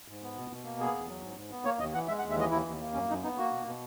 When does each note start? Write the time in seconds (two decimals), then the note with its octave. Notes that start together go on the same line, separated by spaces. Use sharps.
0.08 G#2
0.22 B3
0.36 B2
0.51 B2
0.64 A#3
0.79 B3 G#4
0.94 E2
1.08 F#3
1.23 G#2
1.36 G#2
1.50 B3
1.65 A#3 C#5
1.79 D#2 D#5
1.93 E3 F#5
2.08 G#3 E5
2.19 F#5
2.23 D#2
2.30 E5
2.37 E3 D#5
2.51 D#2 E4
2.66 D#2
2.80 A#3
2.94 F#2 C#4
3.09 F#2 D#4
3.23 B3 D#4
3.37 A#3 F#4
3.51 B2
3.65 B2